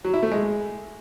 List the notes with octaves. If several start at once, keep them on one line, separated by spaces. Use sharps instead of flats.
F#3
E4
A3
G#3